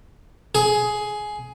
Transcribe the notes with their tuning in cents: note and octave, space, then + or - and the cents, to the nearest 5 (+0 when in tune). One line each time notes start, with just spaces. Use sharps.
G#4 +15